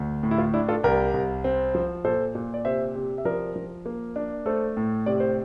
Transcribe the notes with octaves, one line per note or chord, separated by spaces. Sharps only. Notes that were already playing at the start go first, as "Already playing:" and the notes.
Already playing: D2
A2
E4
F4
D4 E4
F4 A4
C2 G4 A#4
C2
C4
F3
A#2 A4 C5
A#2
D5
C3 C5 E5
C3
E5
F3 A#4 D5
F3
A#3
D4
A3 A4 C5
A2
C3 D5
C5